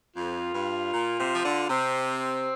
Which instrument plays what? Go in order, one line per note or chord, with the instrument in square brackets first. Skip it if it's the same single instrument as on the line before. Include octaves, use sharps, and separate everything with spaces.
[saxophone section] F2 [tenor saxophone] F4
[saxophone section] G2
A#2
C3
F3
D3
[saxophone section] C3 [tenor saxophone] C4